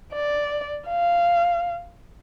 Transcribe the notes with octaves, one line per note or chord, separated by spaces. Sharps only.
D5
F5